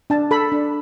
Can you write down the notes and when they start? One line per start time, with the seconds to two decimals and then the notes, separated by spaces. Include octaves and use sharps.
0.10 D4 A5
0.31 A4 B5
0.52 D4